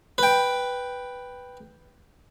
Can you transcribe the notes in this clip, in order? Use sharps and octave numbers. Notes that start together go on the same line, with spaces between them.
B4 G5